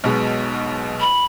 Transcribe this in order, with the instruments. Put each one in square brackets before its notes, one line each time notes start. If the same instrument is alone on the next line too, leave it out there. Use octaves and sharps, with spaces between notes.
[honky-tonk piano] B1 B2 G#3
[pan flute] B5